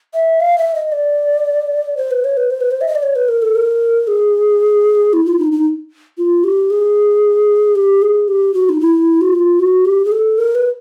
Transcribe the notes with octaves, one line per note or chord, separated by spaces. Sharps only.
E5
F5
E5
D#5
D5
C5
B4
C#5
B4
C5
B4
C5
E5
D#5
D5
C#5
B4
A#4
A4
A#4
G#4
E4
F4
D#4
D#4
F4
G4
G#4
G4
G#4
G4
F#4
D#4
E4
F#4
F4
F#4
G4
G#4
A4
A#4
B4